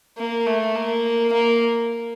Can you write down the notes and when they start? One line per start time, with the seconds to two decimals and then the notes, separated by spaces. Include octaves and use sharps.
0.18 A#3
0.46 A3
0.75 A#3
1.32 A#3